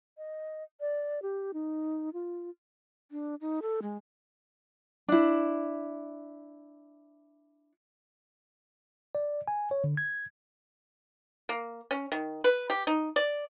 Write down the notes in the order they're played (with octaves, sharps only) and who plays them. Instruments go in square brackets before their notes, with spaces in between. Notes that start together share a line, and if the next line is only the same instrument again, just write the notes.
[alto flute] D#5
D5
G4
D#4
F4
[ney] D4
D#4
A4
G#3
[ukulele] D4 E4
[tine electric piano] D5
G#5
C#5
D3
G#6
[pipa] A#3
C#4
D#3
B4
G4
D#4
D5